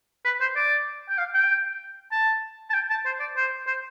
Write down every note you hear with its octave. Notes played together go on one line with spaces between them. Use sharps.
B4
C5
D5
G5
F5
G5
A5
A5
G5
A5
C5
D5
C5
C5